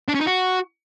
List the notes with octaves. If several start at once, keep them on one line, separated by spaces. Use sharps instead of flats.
D4
C#4
D#4
F#4